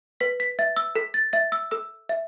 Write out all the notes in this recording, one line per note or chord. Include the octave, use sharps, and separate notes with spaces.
B4 B6
B6
E5 A6
E6
A4 B6
A6
E5 A6
E6
A4 E6
E5